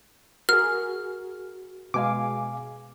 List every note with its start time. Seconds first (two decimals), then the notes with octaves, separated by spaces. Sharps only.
0.49 F#4 G#4 A#4 F6
1.94 B2 G#3 F5 G#5 D6